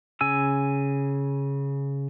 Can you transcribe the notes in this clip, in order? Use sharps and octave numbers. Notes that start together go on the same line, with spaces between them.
C#3 G#5 E6